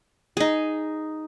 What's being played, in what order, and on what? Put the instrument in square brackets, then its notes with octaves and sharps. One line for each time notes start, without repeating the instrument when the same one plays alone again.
[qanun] D#4 G#4